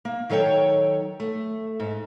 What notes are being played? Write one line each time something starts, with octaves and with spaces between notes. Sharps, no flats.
A#3
D#3 F#3 A4 C#5 G5
A3
G#2